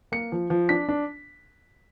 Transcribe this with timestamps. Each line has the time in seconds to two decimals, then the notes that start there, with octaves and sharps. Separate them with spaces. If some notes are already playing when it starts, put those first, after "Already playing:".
0.12 A#3 C#7
0.32 F3
0.50 F3
0.69 D4 B6
0.89 D4